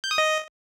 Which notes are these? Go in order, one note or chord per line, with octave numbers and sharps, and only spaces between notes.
G6
D#6
D#5